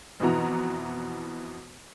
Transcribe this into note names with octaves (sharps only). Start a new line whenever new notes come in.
F2 B2 E3 F#4 A#5